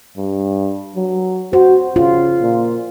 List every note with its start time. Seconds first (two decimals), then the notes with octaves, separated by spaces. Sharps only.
0.17 G2
0.96 F#3
1.53 F#4 C5
1.96 C#3 F4
2.42 A#2